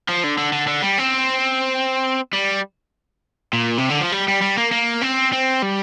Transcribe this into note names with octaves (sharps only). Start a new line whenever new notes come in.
F3
D3
D3
D3
D3
G3
C4
G3
A#2
C3
D3
F3
G3
G3
G3
A#3
A#3
C4
C4
G3